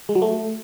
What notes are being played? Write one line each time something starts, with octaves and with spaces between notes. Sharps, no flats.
G#3
F#3
A3